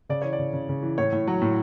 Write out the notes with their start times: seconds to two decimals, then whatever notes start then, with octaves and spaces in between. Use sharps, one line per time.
0.09 C#3 D5
0.22 E3 C#5
0.33 D5
0.39 C#3
0.53 C#3
0.69 C#3
0.83 E3
0.98 A2 C#5
1.12 A2
1.27 F#3
1.42 A2